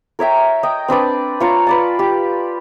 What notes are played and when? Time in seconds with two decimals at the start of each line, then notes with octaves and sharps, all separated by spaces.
0.19 A#4 C#5 E5 G5
0.63 D#5 G5
0.88 C4 D4 B4 D5
1.40 F4 C#5 A#5
1.67 B4 D5 A5
1.99 G4